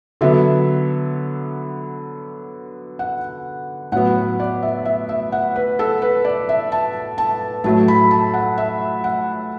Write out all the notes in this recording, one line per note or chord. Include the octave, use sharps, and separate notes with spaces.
D3 F#3 B3 E5
F#5
A2 F#3 B3 F#5
B4
D5
E5
E5
E5
F#5
B4
A4
B4
D5
E5
A5
A5
A2 F#3 A3 A5
B5
A5
F#5
E5
F#5